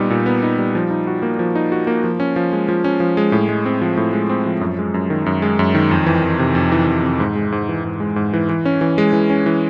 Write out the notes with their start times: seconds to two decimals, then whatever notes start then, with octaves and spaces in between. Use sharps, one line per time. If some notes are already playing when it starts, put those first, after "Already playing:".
Already playing: A#2 G3 B3 D#4
0.10 A#2
0.26 B3
0.43 D#4
0.58 G3
0.75 F3
0.90 D#4
1.07 F#4
1.22 A#3
1.39 F3
1.55 D#4
1.72 F#4
1.87 A#3
2.04 F3
2.20 C#4
2.36 F3
2.53 G#3
2.69 F3
2.84 C#4
3.00 F3
3.17 G#3
3.32 A2
3.49 G#3
3.66 C4
3.81 F3
3.97 A2
4.13 G#3
4.29 C4
4.46 F3
4.61 F#2
4.79 G#3
4.94 F#2
5.10 D#3
5.26 F#2
5.42 G#3
5.59 F#2
5.75 D#3
5.91 F2
6.06 E3
6.24 F2
6.39 C3
6.55 F2
6.72 E3
6.87 F2
7.03 C3
7.20 G#2
7.35 G#3
7.52 G#2
7.69 E3
7.84 G#2
8.00 G#3
8.16 G#2
8.33 E3
8.49 E3
8.65 C#4
8.81 E3
8.98 G#3
9.13 E3
9.30 C#4
9.46 E3